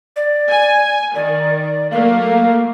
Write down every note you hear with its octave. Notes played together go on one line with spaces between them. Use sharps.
D5
G#5
D#3 D5
F#3 A3 A#3 F5